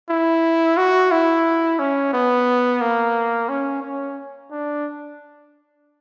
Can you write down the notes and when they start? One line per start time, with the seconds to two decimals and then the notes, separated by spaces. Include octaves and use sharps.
0.10 E4
0.77 F#4
1.11 E4
1.79 C#4
2.13 B3
2.81 A#3
3.49 C#4
3.82 C#4
4.51 D4